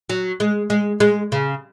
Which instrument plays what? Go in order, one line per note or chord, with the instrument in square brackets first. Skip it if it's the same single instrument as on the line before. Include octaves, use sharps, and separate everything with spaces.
[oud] F#3
G#3
G#3
G#3
C#3